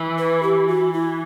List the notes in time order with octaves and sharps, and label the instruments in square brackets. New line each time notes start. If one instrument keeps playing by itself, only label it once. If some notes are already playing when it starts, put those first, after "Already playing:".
Already playing: [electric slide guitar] E3
[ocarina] B4
G4
F#4
E4